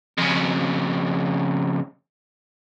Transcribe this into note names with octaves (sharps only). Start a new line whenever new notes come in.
F2 C#3